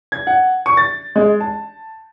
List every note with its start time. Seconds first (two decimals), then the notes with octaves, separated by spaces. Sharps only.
0.12 G#6
0.27 F#5
0.66 C#6
0.77 A6
1.16 G#3
1.40 A5